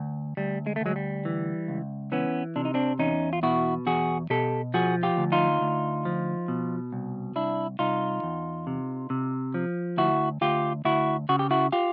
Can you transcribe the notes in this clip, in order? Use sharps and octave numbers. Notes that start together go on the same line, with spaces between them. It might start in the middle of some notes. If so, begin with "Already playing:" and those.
Already playing: D2
D2 G3
G#3
A3
D2 F#3 G#3
G3
E3
C#2
E3 B3 C#4
C3 D4
D#4
C4 D4
E2 C#4 D#4
F4
B2 E4 F#4
E2 F#4 G#4
B2 G4 A4
F3 F#4 G#4
F4 G4
D2
D#4 F4
D2
F3
B2
C2
C2 D4 E4
C2 D#4 F4
E2
C3
C3
F3
D2 E4 F#4
D2 F4 G4
D2 E4 F#4
C#3 F#4
G4
E4 F#4
F4 G4